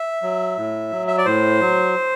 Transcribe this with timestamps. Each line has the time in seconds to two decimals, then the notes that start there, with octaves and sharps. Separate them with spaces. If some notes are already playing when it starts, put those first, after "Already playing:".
Already playing: E5
0.22 F#3
0.57 A2
0.92 F#3
1.08 E5
1.18 D5
1.25 A2 C5
1.61 F#3